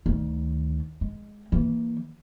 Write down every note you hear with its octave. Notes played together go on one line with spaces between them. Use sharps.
D2 D#3
G#3
E3 A#3